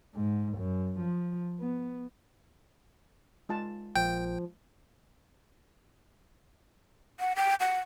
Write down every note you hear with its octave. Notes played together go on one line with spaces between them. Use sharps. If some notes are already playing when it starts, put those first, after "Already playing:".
G#2
F#2
F3
B3
G#3 F4 A5
A#1 F3 G5
F#5
G5
F#5